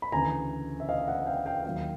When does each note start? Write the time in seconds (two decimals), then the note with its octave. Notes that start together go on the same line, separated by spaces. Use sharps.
0.02 B5
0.12 D2 C#3 E3 G#5 A#5
0.80 E5
0.89 D#5 F5
1.08 E5 F#5
1.27 F5 G5
1.46 F5 G5
1.64 D#2 D#3 F#3 F5 G5